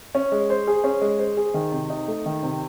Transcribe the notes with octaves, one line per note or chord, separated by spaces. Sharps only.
C#4
G#3
C5
G#4
C#4
G#3
C5
G#4
D#3
C3
D#4
A3
D#3
C3